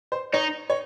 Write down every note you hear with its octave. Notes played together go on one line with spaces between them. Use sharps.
C5
D#4 C#5
C#5